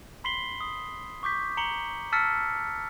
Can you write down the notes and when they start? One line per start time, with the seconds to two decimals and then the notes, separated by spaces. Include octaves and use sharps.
0.24 B5 C6 B6 C7 F#7 G7
0.61 D#6
1.23 C#6 D6 G6 B6
1.57 A#5 C#7 F#7 G7
2.12 A5 E6 F6 A6 B6 C#7